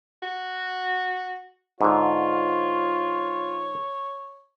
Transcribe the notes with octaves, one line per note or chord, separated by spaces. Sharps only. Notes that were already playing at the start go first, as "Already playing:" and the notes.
F#4
G#2 D3 F4 C#5